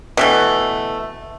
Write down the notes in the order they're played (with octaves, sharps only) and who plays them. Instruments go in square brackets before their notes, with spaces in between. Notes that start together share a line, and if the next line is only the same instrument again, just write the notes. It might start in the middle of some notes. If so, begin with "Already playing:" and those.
[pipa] B2 E3 A3